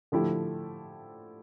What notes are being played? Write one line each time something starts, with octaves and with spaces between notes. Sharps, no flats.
D3 F3 A3 E4 G4